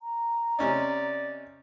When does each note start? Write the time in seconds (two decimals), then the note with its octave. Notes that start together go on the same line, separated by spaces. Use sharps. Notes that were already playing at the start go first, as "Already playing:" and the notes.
0.01 A#5
0.59 C3 C#4 D#4 D5